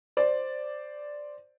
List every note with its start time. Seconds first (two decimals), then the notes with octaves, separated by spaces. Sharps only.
0.17 C5 D5